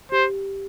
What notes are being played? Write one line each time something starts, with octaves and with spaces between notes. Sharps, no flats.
G4 C5